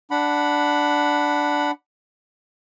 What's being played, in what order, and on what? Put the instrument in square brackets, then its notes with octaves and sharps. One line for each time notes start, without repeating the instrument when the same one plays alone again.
[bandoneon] D4 F#5 B5